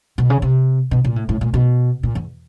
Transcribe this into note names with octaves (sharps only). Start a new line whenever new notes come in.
B2
C#3
C3
B2
A#2
A2
A2
A#2
B2
A#2
E2